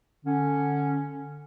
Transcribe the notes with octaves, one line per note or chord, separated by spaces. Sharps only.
D3 C#4